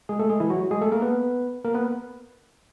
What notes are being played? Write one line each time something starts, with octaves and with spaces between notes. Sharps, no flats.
G#3 G#4
A3 A4
G#3 G#4
E3 E4
F#3 F#4
G#3 G#4
A3 A4
A#3 A#4
B3 B4
A#3 A#4
B3 B4